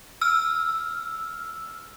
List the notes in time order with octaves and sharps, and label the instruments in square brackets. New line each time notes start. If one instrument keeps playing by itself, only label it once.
[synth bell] E6 F6